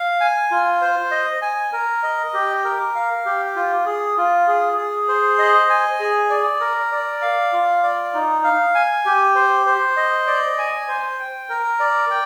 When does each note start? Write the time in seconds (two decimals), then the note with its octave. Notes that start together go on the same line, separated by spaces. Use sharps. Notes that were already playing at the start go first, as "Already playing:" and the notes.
Already playing: F5
0.20 G#5
0.51 F4
0.81 C5
1.11 D#5
1.42 G#5
1.73 A#4
2.03 D#5
2.34 G4
2.65 A#4
2.95 F5
3.26 G4
3.56 F4
3.86 G#4
4.17 F4
4.48 G#4
4.77 G#4
5.08 C5
5.38 D#5
5.70 G#5
6.00 G#4
6.30 D5
6.60 A#4
6.92 D5
7.22 F5
7.53 F4
7.83 D5
8.14 D#4
8.44 F5
8.75 G#5
9.06 G4
9.35 C5
9.66 C5
9.97 D#5
10.27 D5
10.58 G#5
10.88 C5
11.19 G5
11.49 A#4
11.80 D5
12.10 G5